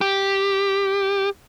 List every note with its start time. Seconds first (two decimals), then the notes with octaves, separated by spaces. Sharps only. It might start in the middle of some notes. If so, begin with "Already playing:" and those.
0.01 G4